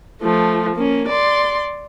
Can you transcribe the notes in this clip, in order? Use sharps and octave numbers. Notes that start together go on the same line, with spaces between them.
F3 A3
A#3 C#4
D5 C6